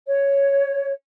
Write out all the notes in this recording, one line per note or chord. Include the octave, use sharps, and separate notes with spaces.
C#5